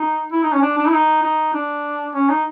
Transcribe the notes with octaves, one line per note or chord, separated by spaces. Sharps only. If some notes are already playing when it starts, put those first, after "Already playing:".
Already playing: D#4
E4
D#4
C#4
D4
D4
E4
D#4
D#4
D4
C#4
D#4